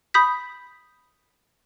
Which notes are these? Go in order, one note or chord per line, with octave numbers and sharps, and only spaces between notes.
B5 D#6 G6 B6